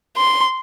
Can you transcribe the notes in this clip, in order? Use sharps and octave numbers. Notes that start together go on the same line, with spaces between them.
C6